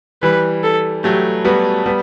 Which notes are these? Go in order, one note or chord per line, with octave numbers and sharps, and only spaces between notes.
E3 G3 B4
A4
F#3 A3 G4
G3 B3 F#4
G3 B3